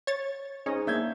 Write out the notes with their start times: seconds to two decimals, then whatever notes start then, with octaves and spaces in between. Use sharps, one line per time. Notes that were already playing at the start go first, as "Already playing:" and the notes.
0.07 C#5 A6
0.66 G#2 C#4 D#5
0.87 A#3 D4 E5 G6 G#6